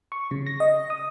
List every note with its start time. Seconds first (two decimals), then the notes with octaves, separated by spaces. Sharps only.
0.12 C#6
0.31 C#3
0.47 A#6
0.60 D#5
0.90 D#6